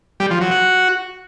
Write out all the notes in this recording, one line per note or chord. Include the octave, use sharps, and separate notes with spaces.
G3
F3
F#3
F#4